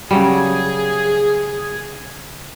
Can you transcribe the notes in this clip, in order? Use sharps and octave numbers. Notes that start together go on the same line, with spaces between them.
C#3 F#3 G3 G#4